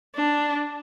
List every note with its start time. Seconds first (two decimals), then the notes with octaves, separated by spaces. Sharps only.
0.15 D4